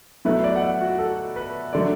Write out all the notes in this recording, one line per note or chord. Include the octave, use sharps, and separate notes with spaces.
B2 F#3 A3 E4 B4
D5
F#5
E5
F#4
A4
B4
D3 F#3 A3 D5